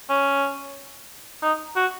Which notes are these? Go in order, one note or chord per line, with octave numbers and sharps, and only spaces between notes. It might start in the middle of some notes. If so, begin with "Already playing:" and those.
C#4
D#4
F#4